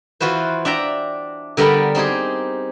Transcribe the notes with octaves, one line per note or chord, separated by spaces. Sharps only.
E3 F4 F#4 B4 C5
D4 E5 G5 A#5
D3 G3 B3 A#4 G5 B5
C4 D#4 G4 G#4